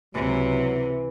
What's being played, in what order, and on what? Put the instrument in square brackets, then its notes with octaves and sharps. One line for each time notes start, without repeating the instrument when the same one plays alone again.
[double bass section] C#2 [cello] C3 [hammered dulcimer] E3 [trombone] F#3